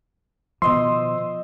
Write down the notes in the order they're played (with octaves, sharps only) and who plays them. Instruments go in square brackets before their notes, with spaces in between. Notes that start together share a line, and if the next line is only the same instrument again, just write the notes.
[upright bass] B2 D#3 [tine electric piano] F3 [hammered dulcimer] C5 D#5 E5 [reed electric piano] C6